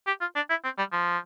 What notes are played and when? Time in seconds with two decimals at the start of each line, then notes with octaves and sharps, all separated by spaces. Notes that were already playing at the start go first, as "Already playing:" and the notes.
0.07 G4
0.21 F4
0.36 D4
0.50 E4
0.64 C4
0.78 G3
0.92 F3